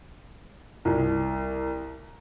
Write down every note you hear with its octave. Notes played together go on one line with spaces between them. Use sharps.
C2